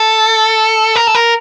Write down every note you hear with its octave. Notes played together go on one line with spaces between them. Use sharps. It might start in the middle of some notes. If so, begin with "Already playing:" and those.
Already playing: A4
A#4
A4
A#4